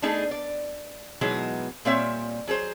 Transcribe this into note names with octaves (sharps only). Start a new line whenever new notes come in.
A3 B3 D4 D#4 G#4
D5
B2 E3 F#3 G#3 D#4
A#2 G3 A#3 C4 C#5 E5
F#3 G#4 A4 C5